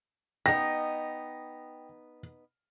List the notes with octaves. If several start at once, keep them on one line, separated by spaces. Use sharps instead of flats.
B3 D#4 G5 A#6